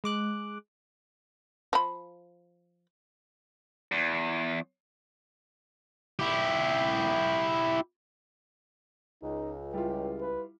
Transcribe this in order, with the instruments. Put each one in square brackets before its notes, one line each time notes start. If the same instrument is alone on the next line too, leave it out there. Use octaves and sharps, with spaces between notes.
[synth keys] G#3 D6 F#6
[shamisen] F3 B5
[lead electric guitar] E2
[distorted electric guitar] E4 G4
[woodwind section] C#2 [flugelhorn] D#4
[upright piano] G3 E4 F4 [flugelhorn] G4
[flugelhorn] B4